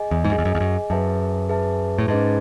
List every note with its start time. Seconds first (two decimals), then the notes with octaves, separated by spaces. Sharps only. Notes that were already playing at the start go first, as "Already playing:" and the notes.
Already playing: G#4 D#5 G#5
0.11 E2
0.25 G#2
0.31 F#2 G#4 D#5 G#5
0.38 E2
0.45 F#2
0.55 E2
0.60 F#2
0.90 F#2 G#4 B4 E5 A5
1.49 G#4 B4 E5 A5
1.98 A2
2.08 G#2 C#4 G#4 B4 D#5 A5